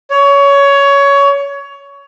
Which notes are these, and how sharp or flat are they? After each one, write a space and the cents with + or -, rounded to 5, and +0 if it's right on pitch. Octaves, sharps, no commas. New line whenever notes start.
C#5 +20